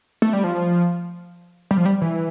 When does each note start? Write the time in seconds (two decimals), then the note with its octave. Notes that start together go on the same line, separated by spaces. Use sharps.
0.22 A3
0.33 G3
0.44 F3
1.71 G3
1.77 F3
1.86 G3
2.01 E3